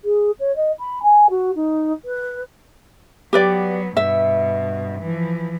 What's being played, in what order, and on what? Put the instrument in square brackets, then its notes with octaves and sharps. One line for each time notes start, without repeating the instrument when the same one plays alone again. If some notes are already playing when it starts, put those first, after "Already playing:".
[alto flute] G#4
C#5
D#5
B5
G#5
F#4
D#4
B4
[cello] F#3 B3 [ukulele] G4 B4 D5
[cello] G2 B2 [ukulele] E5
[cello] E3 F3